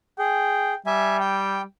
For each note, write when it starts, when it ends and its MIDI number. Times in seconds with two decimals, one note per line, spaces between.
0.19 0.74 68
0.19 0.76 79
0.86 1.63 55
0.86 1.17 76
0.86 1.17 80
1.20 1.62 79